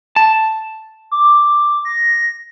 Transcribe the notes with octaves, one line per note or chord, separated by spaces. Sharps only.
A5
D6
A#6